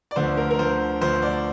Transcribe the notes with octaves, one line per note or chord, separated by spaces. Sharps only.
D5
D2 D3 F3 C5
A#4
A#4
D2 D3 F3 C5
D2 D3 F3 C5
D5